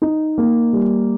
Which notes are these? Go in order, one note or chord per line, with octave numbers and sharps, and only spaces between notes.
D#4
A#3
G3